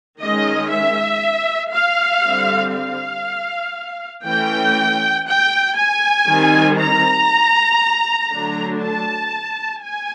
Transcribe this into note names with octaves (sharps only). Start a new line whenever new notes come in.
D#3 G#3 C#4 D#5
E5
F5
D3 G3 C4
F5
E3 A3 C#4 G5
G5
G#5
D#3 G3 C4
A#5
D3 F#3 A3 D4
A5
G#5